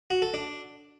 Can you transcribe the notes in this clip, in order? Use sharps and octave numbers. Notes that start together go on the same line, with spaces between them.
F#4
A4
D4